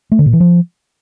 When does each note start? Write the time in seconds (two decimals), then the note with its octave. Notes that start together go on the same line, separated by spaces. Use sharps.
0.12 A3
0.19 D3
0.26 A#2
0.33 E3
0.40 F3